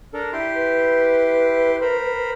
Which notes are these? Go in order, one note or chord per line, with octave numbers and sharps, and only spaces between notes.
D4 A4 A#4
E4 G4 C6
B4
A#4 C5 B5